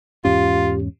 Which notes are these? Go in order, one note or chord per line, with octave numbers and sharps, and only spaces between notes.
E2 G#2 C#4 F4 G4